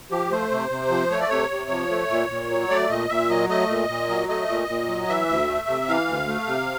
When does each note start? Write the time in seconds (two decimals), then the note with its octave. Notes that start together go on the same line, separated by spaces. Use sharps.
0.11 F3 G4
0.31 A3 C5
0.51 C3
0.71 C3
0.90 F3
1.11 A3 C#5
1.20 D5
1.29 C3 C#5
1.51 C3
1.70 F3
1.90 A3
2.10 A#2
2.30 A#2
2.50 F#3
2.70 A3 D5
2.90 A#2 D#5
3.09 A#2 E5
3.29 F#3 D#5
3.49 A3 D#5
3.69 A#2
3.89 A#2
4.09 F#3
4.29 A3 D#5
4.49 A#2
4.69 A#2
4.88 F#3
5.08 E3 E5
5.29 D2
5.48 A3
5.68 C3
5.88 E3 F5
6.08 D2
6.27 A3
6.47 C3